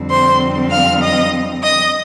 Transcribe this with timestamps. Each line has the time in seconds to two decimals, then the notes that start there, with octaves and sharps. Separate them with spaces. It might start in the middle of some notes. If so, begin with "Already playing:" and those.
Already playing: F2 D3 G3 C4
0.10 C5 C6
0.71 F5 F6
1.02 D#5 D#6
1.63 D#5 D#6